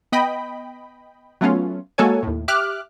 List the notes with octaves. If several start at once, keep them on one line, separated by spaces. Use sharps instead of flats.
B3 D#5 G5 B5
F#3 A3 B3 C#4 F4
G#3 A#3 F#4 A4 C#5 G#5
D#2 A2
G4 E5 D6 F6 F#6